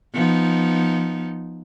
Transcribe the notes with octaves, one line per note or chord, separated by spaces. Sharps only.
F3 B3 D#4